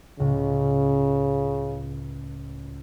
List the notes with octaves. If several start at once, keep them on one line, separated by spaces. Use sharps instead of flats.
C#2 A2 C#3